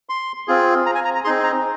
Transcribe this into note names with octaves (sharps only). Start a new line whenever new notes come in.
C6
C4 F4 G#4
A#5
G#5
A#5
A#5
C4 D#4 G#4 C6
A#5